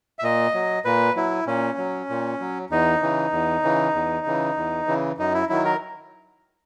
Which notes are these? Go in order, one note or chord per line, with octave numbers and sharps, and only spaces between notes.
E5
A#2 D#5
F#3
A#2 B4
F#3 E4
A#2 C#4
F#3
A#2
F#3
E2 D#4
C#3 E3
E2
C#3 E3
E2
C#3 E3
E2
C#3 E3
F#2 D#4
E4
D#3 F#3 E4
A#4